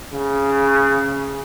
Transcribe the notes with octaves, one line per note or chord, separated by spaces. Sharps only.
C#3